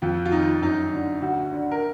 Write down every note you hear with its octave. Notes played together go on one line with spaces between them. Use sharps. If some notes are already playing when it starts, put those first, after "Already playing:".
F2 F4
F4
D#3 D#4
F#2 D#4
D3
D2 F#4
D3
A#4